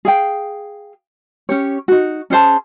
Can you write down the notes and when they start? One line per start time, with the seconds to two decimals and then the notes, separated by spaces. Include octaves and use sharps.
0.05 G#4 F5 G5
1.49 C#4 G4 C#5
1.88 D#4 F#4
2.30 C#4 G#4 C5 A5